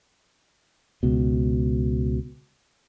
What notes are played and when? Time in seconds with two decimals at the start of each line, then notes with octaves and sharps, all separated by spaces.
1.03 C#2 B2